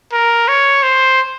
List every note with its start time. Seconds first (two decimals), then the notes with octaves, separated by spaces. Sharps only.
0.13 A#4
0.48 C#5
0.83 C5